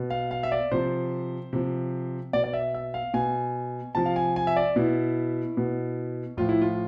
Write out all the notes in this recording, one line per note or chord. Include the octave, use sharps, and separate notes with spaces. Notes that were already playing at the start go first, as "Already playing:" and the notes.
Already playing: B2
F5
F5
E5
D5
C3 F3 C5
C3 F3
B2 D5
D5
E5
E5
F5
B2 G#5
C3 F3 A5
F5
G#5
G#5
E5
D5
B2 E4
B2
A2 F3 F4
E4
F4